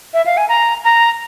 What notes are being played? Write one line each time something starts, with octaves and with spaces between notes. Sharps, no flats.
E5
F5
G#5
A#5
A#5